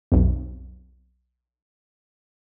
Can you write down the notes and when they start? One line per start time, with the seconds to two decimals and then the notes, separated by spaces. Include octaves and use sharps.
0.12 B1 F2